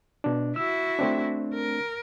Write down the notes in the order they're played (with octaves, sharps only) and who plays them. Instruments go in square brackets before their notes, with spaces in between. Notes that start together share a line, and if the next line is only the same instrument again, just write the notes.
[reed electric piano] B2 D4
[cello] E4 F#4 [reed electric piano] E6
[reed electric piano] A3 C4 D4
[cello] A#4